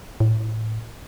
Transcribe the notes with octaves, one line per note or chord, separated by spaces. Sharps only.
A2